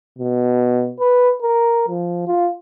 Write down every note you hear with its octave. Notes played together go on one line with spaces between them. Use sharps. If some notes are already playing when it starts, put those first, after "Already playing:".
B2
B4
A#4
F3
F4